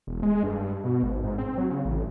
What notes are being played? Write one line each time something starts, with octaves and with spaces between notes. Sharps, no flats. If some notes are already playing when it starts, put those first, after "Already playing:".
E1
G#3
G2
G2
B2
G#1
G#2
C4
F#3
C#3
A1